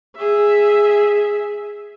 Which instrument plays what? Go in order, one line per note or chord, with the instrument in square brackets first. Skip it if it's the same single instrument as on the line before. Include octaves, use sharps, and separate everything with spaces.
[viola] G#4 E5